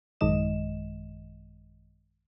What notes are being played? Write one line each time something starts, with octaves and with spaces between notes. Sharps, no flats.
A1 F#2 D#3 G#3 D#5 E7